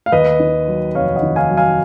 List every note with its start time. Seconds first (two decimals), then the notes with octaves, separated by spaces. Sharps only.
0.06 F5
0.12 D#2 B4 D#5
0.40 D#3
0.68 F#3
0.95 F1 C#5 F5
1.16 D#5 F#5
1.23 D#3
1.36 F5 G#5
1.50 F#3
1.57 F5 G#5